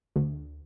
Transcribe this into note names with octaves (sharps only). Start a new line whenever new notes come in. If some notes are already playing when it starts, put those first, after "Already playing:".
D2